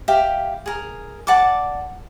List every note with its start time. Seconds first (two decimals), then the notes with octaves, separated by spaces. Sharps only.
0.08 G4 E5 F5 G5
0.66 G#4 A#4
1.27 D5 F#5 A5 D6